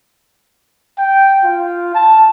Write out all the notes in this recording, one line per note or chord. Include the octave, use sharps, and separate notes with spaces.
G5
F4
A5